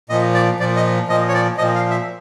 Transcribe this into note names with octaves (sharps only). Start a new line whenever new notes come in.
A#2 F3 D#5
D5
A#2 F3 D5
D#5
A#2 F3 D#5
C#5
D5
A#2 F3 D#5
F5
E5